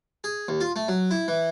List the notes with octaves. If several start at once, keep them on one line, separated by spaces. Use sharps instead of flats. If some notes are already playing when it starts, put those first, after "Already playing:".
G#4
D#2
F4
A3
F#3
E4
E3